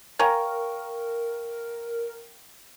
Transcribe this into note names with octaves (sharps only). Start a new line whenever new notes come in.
A#4 C#5 F5 G5 G#5 A#5 C#6